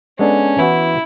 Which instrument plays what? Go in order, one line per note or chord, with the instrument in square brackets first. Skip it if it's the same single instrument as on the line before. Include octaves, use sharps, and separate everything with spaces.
[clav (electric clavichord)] G#3 B3 D4 A4 [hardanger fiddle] C#4
[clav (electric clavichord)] E3 B3 F#4 [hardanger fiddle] E4